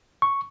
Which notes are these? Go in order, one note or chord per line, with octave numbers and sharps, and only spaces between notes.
C#6